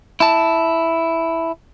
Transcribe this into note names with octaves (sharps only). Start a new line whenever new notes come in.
E4 A5